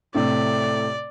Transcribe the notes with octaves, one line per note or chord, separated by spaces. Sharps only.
A2 C3 A3 D5